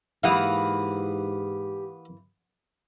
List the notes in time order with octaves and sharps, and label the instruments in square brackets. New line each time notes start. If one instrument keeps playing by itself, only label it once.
[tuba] G#2 [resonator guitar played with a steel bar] E3 A#3 E4 [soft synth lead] G4 [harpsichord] F5 F#5 D#6